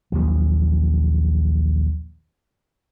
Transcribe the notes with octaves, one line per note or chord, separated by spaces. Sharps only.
A#1 D#2 F#3